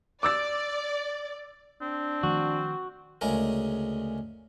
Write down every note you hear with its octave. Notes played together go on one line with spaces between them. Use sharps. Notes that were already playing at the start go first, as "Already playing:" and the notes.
D5 D6 E6 A6
C4 D4
D#3 F3 A3 F#4
D2 C#3 G#3 A#4